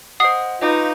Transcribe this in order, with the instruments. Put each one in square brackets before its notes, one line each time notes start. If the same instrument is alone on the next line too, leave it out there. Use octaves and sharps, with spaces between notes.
[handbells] C5 D#5 F#5 [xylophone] D#6 C7
[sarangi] D#4 [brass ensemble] F4 B4 [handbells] D#5 D6 G6